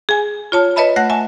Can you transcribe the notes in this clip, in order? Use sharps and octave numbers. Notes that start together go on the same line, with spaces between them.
G#4 G#5
F4 C#5 A5
B4 C#5 D#5 E5 A5 B5
A3 F#5 F#6 A#6
E5 G#5 A5